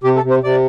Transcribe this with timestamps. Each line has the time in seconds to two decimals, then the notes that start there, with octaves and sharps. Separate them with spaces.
0.04 C3 G4
0.16 A4
0.23 C3
0.30 C5
0.43 C3 D5